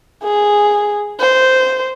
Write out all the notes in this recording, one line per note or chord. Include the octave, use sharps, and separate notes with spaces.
G#4
C5